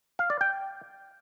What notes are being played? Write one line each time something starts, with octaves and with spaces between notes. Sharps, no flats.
F5
D5
G5